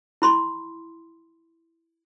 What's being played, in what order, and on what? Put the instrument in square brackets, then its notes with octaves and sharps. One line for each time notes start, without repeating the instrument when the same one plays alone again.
[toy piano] E4 B5 C6